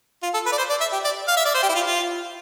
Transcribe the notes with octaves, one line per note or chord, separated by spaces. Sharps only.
F4
A4
B4
D5
C5
D5
E5
G4
D5
F5
E5
D5
C5
G4
E4
F4
F4